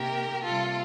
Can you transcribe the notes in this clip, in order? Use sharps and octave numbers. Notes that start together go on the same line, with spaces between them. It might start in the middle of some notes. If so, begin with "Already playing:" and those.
Already playing: C3 D#3 A#3 G4 A#4
C3 G3 A#3 F4 A4